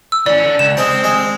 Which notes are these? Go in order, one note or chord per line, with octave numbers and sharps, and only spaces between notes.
E6
E3 C#4 D5
D3
C#2 E7
G#3 C4 A5
G#3